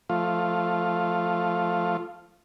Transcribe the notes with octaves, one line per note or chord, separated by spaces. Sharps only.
F3 A3 F4